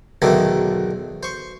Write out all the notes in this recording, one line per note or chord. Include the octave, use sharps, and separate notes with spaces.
B1 E2 D3 D#3 A3
C5 C#6